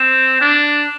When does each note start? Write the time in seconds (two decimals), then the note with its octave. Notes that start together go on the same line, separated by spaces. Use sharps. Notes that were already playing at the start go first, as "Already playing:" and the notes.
Already playing: C4 E7
0.41 D4